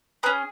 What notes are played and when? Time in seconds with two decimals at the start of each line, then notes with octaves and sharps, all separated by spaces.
0.23 C#4 G#4 B4